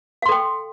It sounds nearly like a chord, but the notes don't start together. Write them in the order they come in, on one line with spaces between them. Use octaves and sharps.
F5 C6 A4 G5